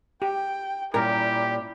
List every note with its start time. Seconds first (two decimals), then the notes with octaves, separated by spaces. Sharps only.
0.22 G4 G5
0.94 A#2 G3 C#4 E4 G4 A#4